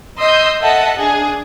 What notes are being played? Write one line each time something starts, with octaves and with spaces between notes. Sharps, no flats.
D#5 C6 D#6 E6 G6
A4 D#5 E5 F#5 A5
D4 G#4